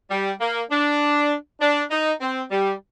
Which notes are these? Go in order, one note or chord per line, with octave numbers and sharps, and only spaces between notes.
G3
A#3
D4
D4
D#4
C4
G3